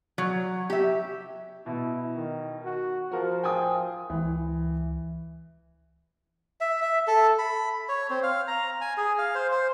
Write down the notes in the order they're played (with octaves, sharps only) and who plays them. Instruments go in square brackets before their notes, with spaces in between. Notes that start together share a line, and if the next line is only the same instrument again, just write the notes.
[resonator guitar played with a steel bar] F#3
G4 E5
[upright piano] B2 [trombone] E4
[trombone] D#3
F#4
[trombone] F3 [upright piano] F#4 A#4
[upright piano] G5 G#5 D#6
[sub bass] C#2 [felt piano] E3
[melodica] E5
E5
A4
B5
C#5
C4
F5
A#5
G#5
G#4
F5
C5
C5